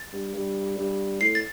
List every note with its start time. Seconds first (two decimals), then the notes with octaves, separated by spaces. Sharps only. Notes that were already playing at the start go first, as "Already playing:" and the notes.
Already playing: A6
0.13 G2
0.34 G2
0.77 G2
1.21 A2 C7
1.35 A6